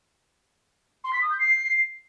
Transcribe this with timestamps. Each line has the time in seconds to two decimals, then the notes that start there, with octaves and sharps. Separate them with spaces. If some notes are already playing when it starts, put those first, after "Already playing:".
1.04 C6
1.13 B6
1.21 D#6
1.30 G6
1.39 C7